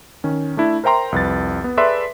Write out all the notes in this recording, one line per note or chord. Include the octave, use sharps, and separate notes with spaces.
D#3 C#4
A3 D4 E4
A#4 C5 E5 G5 A#5 C6
C2 F2 B4 A6
B3
G#4 A4 B4 D5 E5 C6